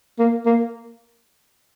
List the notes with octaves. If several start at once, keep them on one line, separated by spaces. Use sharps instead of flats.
A#3
A#3